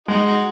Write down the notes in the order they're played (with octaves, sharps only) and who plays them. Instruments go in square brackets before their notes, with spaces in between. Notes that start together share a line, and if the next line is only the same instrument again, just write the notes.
[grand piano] G#3 [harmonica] D#4 F#4
[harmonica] D#4 F#4